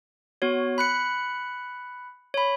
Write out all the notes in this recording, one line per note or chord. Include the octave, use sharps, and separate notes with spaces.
B3 F#4 C#5
B5 F#6 C#7
C#5 B5